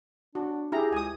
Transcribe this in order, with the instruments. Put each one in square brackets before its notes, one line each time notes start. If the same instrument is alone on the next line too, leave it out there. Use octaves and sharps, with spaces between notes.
[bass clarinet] D4 [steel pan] F#4
[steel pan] E4 G4 A#5 [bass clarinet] G#4
[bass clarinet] C#2 [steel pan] G#5 D#6